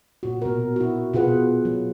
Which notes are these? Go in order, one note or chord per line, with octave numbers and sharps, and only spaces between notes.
A#2 F#4
B2 A#4
E4 F#4
B2 F4 G#4 B4 F#5
F#3